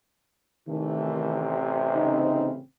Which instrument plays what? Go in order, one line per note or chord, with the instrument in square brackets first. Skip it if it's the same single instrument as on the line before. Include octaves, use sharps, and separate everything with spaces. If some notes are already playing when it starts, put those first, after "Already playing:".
[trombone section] A1 C3 [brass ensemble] D#3 E3 A3
[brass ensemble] C#3 C4 [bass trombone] D#4